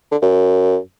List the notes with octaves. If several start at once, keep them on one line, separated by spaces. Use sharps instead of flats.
D3
F#2